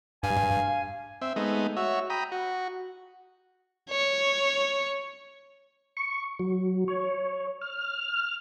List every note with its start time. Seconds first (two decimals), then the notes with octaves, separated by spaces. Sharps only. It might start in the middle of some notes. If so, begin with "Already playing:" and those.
0.23 G2 F5 G#5
1.22 C4 E5
1.36 G#3 A3 B3 D#4
1.77 F#4 C#5 E5
2.10 G5 A#5 B5 D#6
2.32 F#4
3.90 C#5
5.97 C#6
6.39 F#3
6.88 C#5
7.61 F6